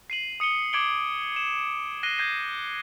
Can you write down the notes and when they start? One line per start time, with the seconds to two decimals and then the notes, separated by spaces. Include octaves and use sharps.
0.10 C7 D#7 F#7
0.40 D#6 C#7 D#7 G7
0.73 D6 G#6 C7 D7 F#7 G7
1.36 E7
2.03 F#6 A#6 C7 D#7 G7
2.18 G6 G#6 A#6 C7 D#7